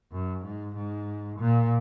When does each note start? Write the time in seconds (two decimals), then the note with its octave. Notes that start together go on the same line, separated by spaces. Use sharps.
0.12 F#2
0.44 G#2
0.76 G#2
1.39 A#2